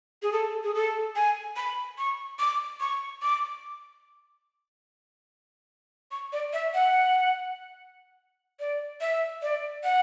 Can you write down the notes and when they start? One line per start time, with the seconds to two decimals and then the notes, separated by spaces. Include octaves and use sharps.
0.23 G#4
0.32 A4
0.64 G#4
0.74 A4
1.16 G#5
1.57 B5
1.98 C#6
2.39 D6
2.80 C#6
3.22 D6
6.11 C#6
6.33 D5
6.53 E5
6.74 F#5
8.60 D5
9.01 E5
9.42 D5
9.84 F#5